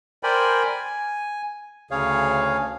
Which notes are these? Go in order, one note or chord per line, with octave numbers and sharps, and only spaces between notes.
A#4 C5 D5 G5 G#5 B5
G#5
D2 C#3 G#4 C#5 F5